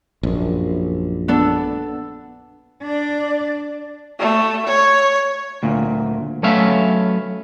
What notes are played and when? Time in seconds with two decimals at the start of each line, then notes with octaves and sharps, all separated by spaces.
0.23 A#1 F#2
1.28 B3 D4 A4
2.82 D4 D5
4.19 A3
4.66 C#5
5.63 D2 A#2
6.43 F#3 A3 B3 C#4 E5 F5